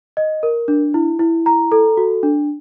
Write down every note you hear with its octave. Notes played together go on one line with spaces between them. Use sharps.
D#5
A#4
D4
E4
E4
A#5
A4
F#4
D4